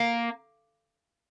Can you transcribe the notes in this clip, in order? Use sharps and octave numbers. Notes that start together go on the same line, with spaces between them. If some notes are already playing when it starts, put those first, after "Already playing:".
Already playing: A#3